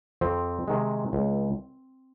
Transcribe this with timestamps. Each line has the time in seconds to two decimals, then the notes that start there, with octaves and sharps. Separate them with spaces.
0.21 F2 C4
0.68 C3 D#3 G#3
1.13 C#2